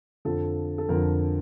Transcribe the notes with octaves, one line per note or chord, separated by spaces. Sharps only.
F2 D3 F3 A4
A4
F2 D3 F3 A#4